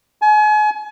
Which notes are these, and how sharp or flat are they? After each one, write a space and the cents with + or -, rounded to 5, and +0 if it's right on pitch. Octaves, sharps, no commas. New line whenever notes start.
G#5 +35